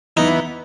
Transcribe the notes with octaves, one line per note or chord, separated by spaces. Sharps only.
E3 B3 D#4